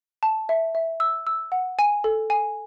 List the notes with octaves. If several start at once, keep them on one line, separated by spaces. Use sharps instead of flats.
A5
E5
E5
E6
E6
F#5
G#5
A4
G#5